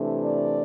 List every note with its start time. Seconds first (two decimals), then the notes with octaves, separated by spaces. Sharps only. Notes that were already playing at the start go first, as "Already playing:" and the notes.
Already playing: C3 E3 A3 D4
0.24 D5